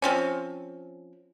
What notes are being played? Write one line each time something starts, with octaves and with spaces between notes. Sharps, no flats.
F3 C4 C#4